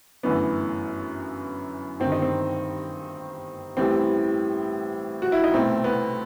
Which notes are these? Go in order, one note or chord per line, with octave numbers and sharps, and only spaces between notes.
G1 F#2 E3 A3 B3
G1 G2 D#3 C4
D#4
C4
A1 A2 E3 G3 C4
F#4
E4
D#4
C2 B2 A3 C4
B3